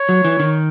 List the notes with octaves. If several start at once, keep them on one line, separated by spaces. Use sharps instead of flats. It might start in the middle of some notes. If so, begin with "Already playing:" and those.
Already playing: C#5
F#3
E3
D#3